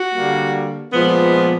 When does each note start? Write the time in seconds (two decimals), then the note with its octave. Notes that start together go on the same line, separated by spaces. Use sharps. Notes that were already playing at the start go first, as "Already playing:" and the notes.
Already playing: F#4
0.14 D3 G3 A#3
0.93 A#2 F3 G#3 B3